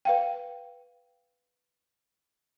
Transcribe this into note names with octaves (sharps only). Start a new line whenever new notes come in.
B4 F5 G5